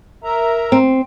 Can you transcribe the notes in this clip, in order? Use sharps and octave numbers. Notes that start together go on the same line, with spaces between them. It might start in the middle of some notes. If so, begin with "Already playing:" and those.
A#4 E5 A#5
C4